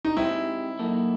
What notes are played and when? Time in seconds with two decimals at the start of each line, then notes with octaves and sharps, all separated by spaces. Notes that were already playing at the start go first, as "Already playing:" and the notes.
0.05 D#4
0.17 G#3 C4 D#4 E4 G4 C5
0.79 F#3 A#3 D#4 F#4 A4